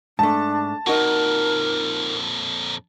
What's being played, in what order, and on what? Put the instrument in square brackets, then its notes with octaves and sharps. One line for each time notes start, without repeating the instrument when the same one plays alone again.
[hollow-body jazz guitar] G#2 A3 [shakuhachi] D4 [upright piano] A5
[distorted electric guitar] F2 A#2 [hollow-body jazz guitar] D#4 F#4 [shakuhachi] A#4